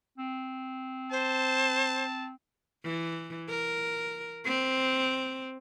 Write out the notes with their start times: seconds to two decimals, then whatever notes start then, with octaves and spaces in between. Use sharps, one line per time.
0.18 C4
1.11 C5 A5
2.84 E3
3.49 A#4
4.45 C4